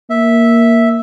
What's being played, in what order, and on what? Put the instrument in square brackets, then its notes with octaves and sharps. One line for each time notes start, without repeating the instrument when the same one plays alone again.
[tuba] A#3 [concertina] E5